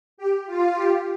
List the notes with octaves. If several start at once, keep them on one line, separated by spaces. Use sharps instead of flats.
G4
F4
G4